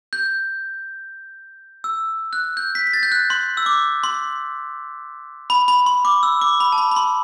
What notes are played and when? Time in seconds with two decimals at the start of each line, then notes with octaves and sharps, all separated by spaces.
0.13 G6
1.84 E6
2.33 F#6
2.57 G6
2.75 B6
2.87 B6
2.93 A6
3.03 G6
3.12 F#6
3.30 C6
3.57 E6
3.66 D6
4.04 C6
5.50 B5
5.68 B5
5.86 C6
6.05 D6
6.23 E6
6.41 D6
6.60 B5
6.72 A5
6.78 B5
6.91 B5
6.96 C6